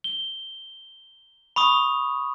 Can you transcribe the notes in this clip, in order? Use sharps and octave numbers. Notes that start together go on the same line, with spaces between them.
G7
B5 C#6 D#6